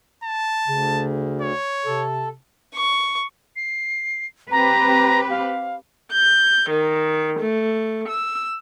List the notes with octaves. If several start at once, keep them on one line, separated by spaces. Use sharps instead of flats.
A5
D2 C#3
C#5
C3 A4
C#6
C7
C4 G4 B4 A#5
F5
G6
D#3
A3
E6